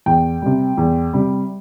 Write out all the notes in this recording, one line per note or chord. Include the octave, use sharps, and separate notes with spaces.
E2 G5
C3 G3
E2
C3 G3